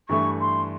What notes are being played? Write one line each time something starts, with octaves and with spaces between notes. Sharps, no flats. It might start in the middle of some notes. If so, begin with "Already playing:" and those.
G2 E3 A3 C#6
C6